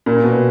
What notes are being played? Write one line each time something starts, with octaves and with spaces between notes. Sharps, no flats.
A#2
B2